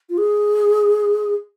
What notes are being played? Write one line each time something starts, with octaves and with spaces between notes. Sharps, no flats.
F4
G#4